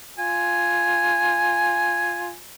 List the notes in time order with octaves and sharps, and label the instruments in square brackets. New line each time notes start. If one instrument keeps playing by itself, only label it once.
[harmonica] F4 G#5